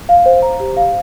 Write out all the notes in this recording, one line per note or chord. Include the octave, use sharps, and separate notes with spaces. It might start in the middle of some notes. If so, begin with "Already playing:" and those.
F5
C5
A#5
G4
F5